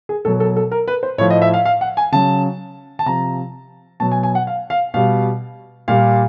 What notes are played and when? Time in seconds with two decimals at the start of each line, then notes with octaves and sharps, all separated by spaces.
0.09 G#4
0.25 B2 F#3 A4
0.40 A4
0.56 A4
0.71 A#4
0.88 B4
1.03 C5
1.18 A2 C#5
1.21 F3
1.30 D#5
1.42 E5
1.54 F5
1.65 F5
1.81 F#5
1.97 G#5
2.12 C#3 F#3 A5
2.99 A5
3.06 C3 F3 A#5
4.00 B2 F#3 A5
4.12 G#5
4.23 G#5
4.35 F#5
4.47 F5
4.70 F5
4.94 B2 G3 F5
5.88 A#2 G3 F5